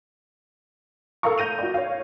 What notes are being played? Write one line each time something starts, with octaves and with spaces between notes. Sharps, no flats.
A4 A#4 F5 A5 A#5 C#6
G6 A#6 D#7 F7
F#4 D5
C#5 F5